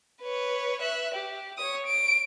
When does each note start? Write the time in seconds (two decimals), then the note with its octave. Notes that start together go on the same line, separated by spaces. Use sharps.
0.22 B4 C#5
0.82 E5 F#6
1.15 G4
1.58 C#5 D#6
1.86 D7